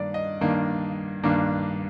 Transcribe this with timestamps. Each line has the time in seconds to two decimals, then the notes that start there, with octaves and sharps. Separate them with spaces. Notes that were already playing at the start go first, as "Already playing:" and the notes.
Already playing: G2 D#3 A#3 D4 D5
0.14 D#5
0.41 G2 D#3 A#3 D4
1.23 G2 D#3 A#3 D4